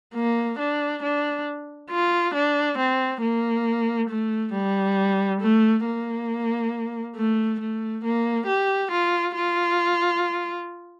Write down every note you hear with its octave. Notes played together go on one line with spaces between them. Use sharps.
A#3
D4
D4
F4
D4
C4
A#3
A3
G3
A3
A#3
A3
A3
A#3
G4
F4
F4